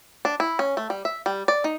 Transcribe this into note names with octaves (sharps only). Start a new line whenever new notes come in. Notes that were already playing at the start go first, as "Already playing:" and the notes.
D4
E4
C#4
A3
G3
E5
G3
D5
D#4